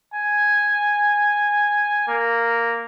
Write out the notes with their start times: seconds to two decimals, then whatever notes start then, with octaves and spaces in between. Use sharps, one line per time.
0.14 G#5
2.08 A#3